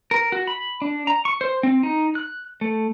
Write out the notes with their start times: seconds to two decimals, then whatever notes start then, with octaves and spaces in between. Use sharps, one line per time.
0.11 A#4
0.32 F#4
0.47 B5
0.82 D4
1.07 A#5
1.25 C#6
1.41 C5
1.63 C4
1.83 D#4
2.15 F#6
2.61 A3